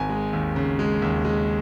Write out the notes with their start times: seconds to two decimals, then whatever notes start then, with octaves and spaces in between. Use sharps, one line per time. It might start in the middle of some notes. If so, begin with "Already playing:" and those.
Already playing: G#1 G#5
0.10 G#3
0.33 D#2
0.56 C#3
0.79 G#3
1.02 D#2
1.25 G#3